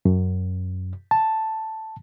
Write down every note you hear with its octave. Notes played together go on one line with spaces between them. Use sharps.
F#2
A5